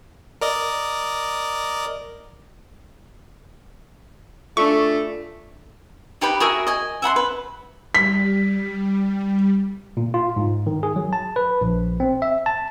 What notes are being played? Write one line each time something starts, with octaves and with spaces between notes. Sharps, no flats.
A#4 D5 D#5
A3 D4 F4 A4 D5 C#6
D#4 G4 B4 B5
F#4 G#4 A#4 E5
D#5 G#5
E5 F#5 B5 C6
B4
G3 B6
A#2
F4
G#2
D#3
G#4
F#3
A5
B4
A#1
C4
E5
A5